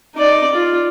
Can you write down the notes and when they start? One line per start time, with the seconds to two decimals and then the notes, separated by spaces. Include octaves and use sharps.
0.15 D#4 D5
0.55 F4